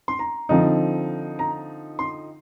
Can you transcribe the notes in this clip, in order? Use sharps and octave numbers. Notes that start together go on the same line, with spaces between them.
C6
A#5
D3 F3 C4 D#4
A#5
C6